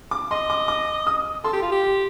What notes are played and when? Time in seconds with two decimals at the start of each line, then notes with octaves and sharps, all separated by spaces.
0.11 D6
0.31 D#5 C6
0.50 D6
0.68 D6
1.07 D#6
1.44 A4 C6
1.53 G4
1.62 F4
1.72 G4